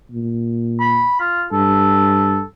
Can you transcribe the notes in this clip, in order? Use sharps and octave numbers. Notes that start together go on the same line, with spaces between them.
A#2
B5
F4
G2 A4